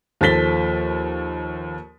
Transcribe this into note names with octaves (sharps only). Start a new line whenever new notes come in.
D#2 F3 A4 A6 B6 G7